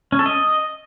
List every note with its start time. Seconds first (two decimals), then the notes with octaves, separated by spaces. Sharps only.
0.12 C#4
0.19 A4
0.26 D#5